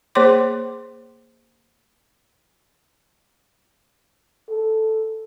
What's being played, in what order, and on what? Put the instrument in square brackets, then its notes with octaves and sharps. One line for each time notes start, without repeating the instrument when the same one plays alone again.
[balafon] A#3 G#4 C5 C#5 C6 D6
[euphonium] A4